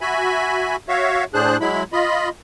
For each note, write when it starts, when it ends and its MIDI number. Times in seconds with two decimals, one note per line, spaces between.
0.01 0.76 66
0.01 0.76 76
0.01 0.76 80
0.01 0.76 83
0.88 1.24 66
0.88 1.24 73
0.88 1.24 76
0.88 1.24 77
1.34 1.57 45
1.34 1.57 62
1.34 1.57 68
1.34 1.57 72
1.34 1.57 90
1.61 1.83 54
1.61 1.83 56
1.61 1.83 64
1.61 1.83 83
1.93 2.29 65
1.93 2.29 75
1.93 2.29 83